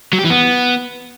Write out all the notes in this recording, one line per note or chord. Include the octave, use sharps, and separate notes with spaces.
F#3
G4
E3
B3